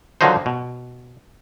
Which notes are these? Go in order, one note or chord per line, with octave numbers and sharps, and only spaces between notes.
D3 D#3 F3 F#3 D#4 C5
B2